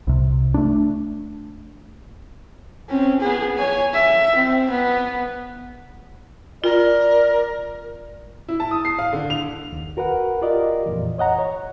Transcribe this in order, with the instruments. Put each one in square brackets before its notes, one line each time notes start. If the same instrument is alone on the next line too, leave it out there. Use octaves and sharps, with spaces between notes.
[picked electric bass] C2 C3
A3 D4
[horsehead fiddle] C4 C#4
B3 G#4
C#5 G#5
E5
C4
B3
[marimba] F4 [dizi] A#4 [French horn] D5
[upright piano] E4
A5
D#6
C7
F5
D3
F7
[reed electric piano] D#2
F#4 A#4 B4 F#5
F4 G4 A#4 D5 D#5
F2 A#2 E3
C#5 D#5 F#5 A#5
C#5